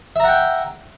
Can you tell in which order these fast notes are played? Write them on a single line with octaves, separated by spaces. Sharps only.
E5 A#5 F#5 G5